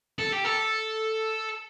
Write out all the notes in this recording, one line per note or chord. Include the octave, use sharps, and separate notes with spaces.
A4
G4
A4